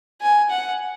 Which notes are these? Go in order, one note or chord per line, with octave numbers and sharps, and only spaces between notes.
G#5
F#5